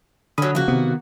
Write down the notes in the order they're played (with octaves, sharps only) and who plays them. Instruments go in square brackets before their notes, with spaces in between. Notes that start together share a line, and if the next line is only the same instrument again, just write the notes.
[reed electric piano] D3 B5 D#6 [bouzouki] F#3 C#4
[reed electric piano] C#3 F3 [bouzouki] A#3 F#4
[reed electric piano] C3 [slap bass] D#3 B3